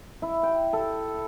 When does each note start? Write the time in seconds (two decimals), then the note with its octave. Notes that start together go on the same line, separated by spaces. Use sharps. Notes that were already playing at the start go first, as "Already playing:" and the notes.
0.22 E4
0.43 G5
0.73 A4